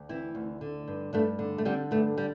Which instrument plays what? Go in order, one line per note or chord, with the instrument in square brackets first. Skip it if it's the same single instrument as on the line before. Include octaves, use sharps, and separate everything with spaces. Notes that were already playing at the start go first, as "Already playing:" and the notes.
Already playing: [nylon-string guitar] D2
E3 C4 E4
D2
D3
G2
G2 A3 D4
D3
A3
D3 G3 C4
G2 A3
G3